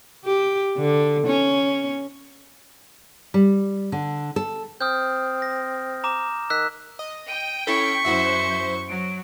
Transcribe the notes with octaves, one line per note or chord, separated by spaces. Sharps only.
G4
D3
C#4
G3
D3
A4
C4 D#6 F6 G6
A#6
A#5 D6 E7
D#3 E6 F#6 B6
D#5
G5 D#7
C#4 E4 A4 C#6 B6
F#2 E4 F#4 C5 E5
F#3 D7